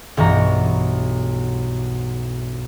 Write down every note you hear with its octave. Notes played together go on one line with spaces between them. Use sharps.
B1 G2 E3 F#4 A#5